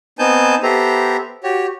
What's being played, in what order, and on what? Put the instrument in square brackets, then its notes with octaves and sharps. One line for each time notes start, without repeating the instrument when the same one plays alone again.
[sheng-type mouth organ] B3 C4 D#4 G#5 A5 G6
B3 G4 A4 C5 E5 A#5
F#4 G4 C#5